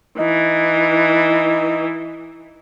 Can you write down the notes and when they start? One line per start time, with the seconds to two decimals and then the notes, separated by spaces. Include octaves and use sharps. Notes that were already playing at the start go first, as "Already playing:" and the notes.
0.19 E3 D#4